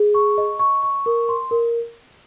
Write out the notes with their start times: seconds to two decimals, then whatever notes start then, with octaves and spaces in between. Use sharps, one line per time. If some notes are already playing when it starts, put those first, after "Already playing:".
Already playing: G#4
0.14 C#6
0.38 D#5
0.59 C#6
0.83 C#6
1.06 A#4
1.29 C6
1.51 A#4